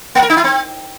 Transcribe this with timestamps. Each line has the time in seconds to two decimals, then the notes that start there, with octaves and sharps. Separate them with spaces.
0.15 A#3
0.22 A#4
0.30 D#4
0.37 E4
0.44 C4